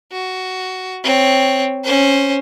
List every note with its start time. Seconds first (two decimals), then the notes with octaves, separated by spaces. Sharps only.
0.12 F#4
1.04 C4 C#5
1.84 C#4 C5